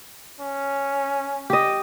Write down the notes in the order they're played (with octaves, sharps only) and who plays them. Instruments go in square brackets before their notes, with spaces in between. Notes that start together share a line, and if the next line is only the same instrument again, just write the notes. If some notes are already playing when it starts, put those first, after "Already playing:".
[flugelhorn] C#4
[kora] G4 D#5